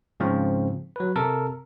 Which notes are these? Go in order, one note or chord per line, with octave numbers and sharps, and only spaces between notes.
G#2 C#3 F3 C4
F#3 B4
C3 A4 A#4